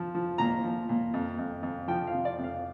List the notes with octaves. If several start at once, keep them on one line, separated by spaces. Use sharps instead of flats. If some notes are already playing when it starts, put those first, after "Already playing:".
Already playing: F3
F3
A#2 A#5
F3
A#2
F2
F2
F2
F3 G5
F5
C3
D5
F2
F5